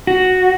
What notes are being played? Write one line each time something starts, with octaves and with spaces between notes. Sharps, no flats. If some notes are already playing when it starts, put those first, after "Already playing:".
F#4